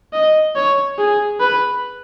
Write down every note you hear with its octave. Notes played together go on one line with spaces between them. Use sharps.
D#5
C#5
G#4
B4